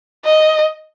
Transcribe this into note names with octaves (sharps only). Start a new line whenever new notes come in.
D#5